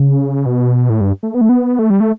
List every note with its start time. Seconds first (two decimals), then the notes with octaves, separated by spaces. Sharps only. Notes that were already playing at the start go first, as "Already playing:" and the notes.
Already playing: C#3
0.46 B2
0.90 A2
1.01 G2
1.23 A3
1.35 B3
1.41 A3
1.49 B3
1.79 A3
1.90 G3
2.00 A3